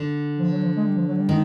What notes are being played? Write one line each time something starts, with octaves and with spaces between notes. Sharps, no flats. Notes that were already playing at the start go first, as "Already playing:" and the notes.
Already playing: D3
F3
F#3
F3
G#3
G3
F3
F#3
G3
D#3 G#3